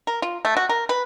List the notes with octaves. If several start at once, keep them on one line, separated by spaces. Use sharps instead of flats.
A#4
F4
A3
F#4
A#4
B4